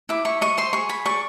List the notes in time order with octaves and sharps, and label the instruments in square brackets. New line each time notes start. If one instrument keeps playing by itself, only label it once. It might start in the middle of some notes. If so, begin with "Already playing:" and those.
[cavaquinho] E4 D6
E4 C#6
D#5 C#6
C5 C6
G#4 C#6
G#4 B5
D5 C#6